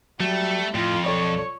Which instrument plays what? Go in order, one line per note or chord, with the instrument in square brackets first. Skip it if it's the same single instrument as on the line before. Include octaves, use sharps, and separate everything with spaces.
[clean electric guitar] F#3 [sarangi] G3 [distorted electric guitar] A3
[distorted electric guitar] F2 [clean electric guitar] A2 [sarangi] F4
[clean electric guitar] B1 A4 D5 [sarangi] C#5